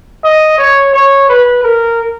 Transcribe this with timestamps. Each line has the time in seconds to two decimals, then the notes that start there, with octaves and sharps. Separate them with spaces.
0.23 D#5
0.58 C#5
0.93 C#5
1.28 B4
1.63 A#4